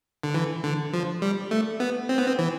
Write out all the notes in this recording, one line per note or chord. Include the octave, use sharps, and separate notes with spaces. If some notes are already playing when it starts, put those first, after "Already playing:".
D3
E3
D3
F3
G3
A3
B3
C4
B3
C4
E3